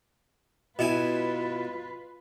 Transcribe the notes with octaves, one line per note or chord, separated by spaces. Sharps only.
B2 E4 F4 B4 G#5